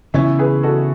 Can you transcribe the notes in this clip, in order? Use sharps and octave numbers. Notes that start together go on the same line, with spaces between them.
C#3 E3 B3 C#4 E4
G#4 B4
F#4 A4